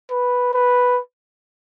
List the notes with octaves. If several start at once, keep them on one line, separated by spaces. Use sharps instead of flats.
B4
B4